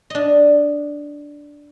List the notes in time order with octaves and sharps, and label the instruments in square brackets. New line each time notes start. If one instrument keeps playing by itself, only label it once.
[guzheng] D4 D#5